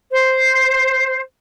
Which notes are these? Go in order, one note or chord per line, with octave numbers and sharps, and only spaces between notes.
C5